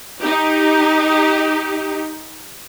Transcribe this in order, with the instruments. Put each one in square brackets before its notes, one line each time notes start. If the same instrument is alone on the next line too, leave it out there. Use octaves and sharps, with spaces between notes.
[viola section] D#4 G4